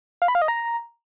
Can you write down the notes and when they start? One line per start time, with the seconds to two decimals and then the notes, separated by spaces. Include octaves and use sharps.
0.22 F5
0.28 B5
0.35 F5
0.42 D#5
0.48 A#5